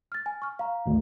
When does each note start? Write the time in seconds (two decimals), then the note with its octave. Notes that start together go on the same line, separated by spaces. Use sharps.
0.12 F6 A6
0.26 G#5
0.42 C#6 F6
0.59 F5 A#5
0.86 G#1 D2